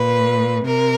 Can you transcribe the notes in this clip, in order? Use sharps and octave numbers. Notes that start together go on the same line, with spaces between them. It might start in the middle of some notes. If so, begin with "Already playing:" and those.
Already playing: A#2 B4
C3 A#4